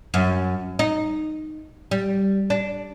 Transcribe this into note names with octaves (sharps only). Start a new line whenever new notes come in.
F#2
D#4
G3
D4